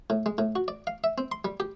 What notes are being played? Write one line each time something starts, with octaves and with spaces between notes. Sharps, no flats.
A2
G#3
A2
F#4
D5
F5
E5
C4
C6
G3
G4